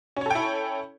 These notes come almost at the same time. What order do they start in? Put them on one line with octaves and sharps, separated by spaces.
C#4 C#5 A4 G5 E4